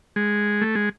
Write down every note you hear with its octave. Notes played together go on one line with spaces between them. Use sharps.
G#3
A3
G#3